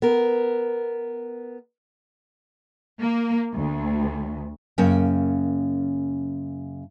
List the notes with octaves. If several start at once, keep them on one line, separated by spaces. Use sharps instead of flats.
B3 A#4
A#3
D2
F#2 C#3 A#3 C#4 G5